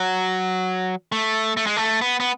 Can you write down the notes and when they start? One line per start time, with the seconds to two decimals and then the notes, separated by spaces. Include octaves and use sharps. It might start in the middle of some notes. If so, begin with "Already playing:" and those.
Already playing: F#3
1.12 A3
1.57 A3
1.66 G#3
1.77 A3
2.02 B3
2.20 B3